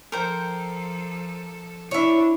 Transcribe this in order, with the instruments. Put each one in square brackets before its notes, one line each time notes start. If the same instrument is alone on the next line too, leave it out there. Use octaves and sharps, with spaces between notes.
[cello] F3 A4 [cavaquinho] A#4 C5 G5
[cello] D4 [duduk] E4 [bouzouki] C#5 E5